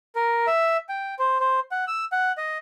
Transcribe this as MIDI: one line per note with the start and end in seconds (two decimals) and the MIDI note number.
0.15 0.46 70
0.47 0.77 76
0.89 1.15 79
1.19 1.38 72
1.40 1.60 72
1.71 1.85 78
1.87 2.05 88
2.12 2.32 78
2.37 2.58 75